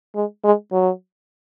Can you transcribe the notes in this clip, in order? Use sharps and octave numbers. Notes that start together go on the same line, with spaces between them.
G#3
G#3
F#3